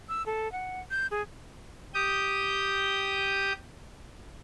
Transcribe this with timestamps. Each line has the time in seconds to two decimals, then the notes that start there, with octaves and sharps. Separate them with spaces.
0.09 E6
0.26 A4
0.52 F#5
0.91 G6
1.11 G#4
1.94 G4 D#6 G6